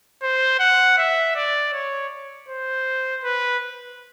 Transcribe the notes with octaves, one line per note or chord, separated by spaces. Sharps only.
C5
F#5
E5
D5
C#5
C5
B4